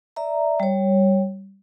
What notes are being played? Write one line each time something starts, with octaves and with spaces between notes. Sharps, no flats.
D5 E5 A#5
G3 C#5